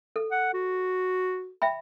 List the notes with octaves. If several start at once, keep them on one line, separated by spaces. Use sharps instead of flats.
A4
F#5
F#4
E5 G5 B5